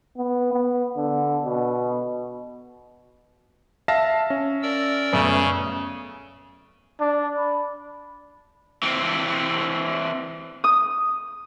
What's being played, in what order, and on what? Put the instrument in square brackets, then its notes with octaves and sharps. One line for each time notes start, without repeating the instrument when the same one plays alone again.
[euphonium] B3
B3
D3
B2
[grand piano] E5 [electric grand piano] F5 A5 A#6
[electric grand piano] C#4
[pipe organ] A#4 D5 E6
[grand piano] F#2 A3 B3 [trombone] C#3
[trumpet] D4
B5
[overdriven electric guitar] E3 C4
[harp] D#6